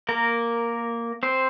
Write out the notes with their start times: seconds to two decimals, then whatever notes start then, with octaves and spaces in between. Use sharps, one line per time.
0.09 A#3 A#4
1.23 C4 C5